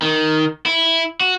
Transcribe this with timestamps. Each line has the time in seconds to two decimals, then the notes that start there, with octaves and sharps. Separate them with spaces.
0.02 D#3
0.66 E4
1.21 F#4